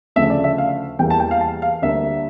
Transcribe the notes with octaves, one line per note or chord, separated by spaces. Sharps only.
D2 C#3 F3 A3 E5
D5
E5
F5
E2 E3 G3 A#3 G5
A5
G5
F5
A5
F5
D2 D3 G3 A#3 E5